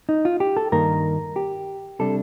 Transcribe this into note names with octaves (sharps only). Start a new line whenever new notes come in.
D#4
F4
G4
A4
G2 D#3 A#3 A#4
G4
C3 G3 D4 A4